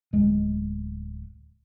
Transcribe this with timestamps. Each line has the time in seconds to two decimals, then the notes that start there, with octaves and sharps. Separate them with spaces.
0.13 D1 G#3